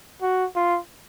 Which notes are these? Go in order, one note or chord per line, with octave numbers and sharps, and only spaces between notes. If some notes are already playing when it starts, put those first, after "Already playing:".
F#4
F4